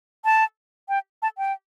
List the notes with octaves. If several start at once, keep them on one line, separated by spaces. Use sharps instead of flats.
A5
G5
A5
G5